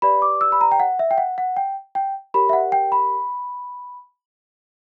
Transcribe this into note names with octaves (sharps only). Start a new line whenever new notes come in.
G4 B4 D5 B5
D6
E6
B5
A#5
G5
F#5
E5
G5
F#5
F#5
G5
G5
G4 A#4 C#5 B5
E5
F#5
G5
B5